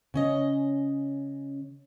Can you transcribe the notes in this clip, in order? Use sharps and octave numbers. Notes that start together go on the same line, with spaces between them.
C#3 C#4 D#5